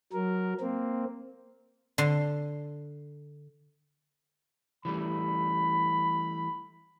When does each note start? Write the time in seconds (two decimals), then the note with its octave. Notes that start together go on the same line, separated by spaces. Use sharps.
0.13 F#3 A#4
0.60 A#3 C4
1.98 D3 C6
4.85 E3 G3 A3 B5